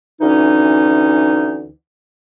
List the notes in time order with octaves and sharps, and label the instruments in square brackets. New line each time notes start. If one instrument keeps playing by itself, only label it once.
[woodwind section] D2 E3 C#4 D#4